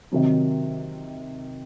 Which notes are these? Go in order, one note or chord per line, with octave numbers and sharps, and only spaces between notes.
C3 D#3 F#3 C4 D#4